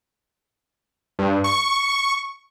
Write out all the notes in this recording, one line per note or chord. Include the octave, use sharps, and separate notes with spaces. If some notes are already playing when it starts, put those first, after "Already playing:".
G2
C#6